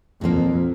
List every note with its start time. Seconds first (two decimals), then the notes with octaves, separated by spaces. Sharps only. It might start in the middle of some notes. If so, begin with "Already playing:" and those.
0.21 F2 A#2 F3 A#3